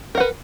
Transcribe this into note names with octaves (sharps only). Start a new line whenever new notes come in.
A#4 B4 F#5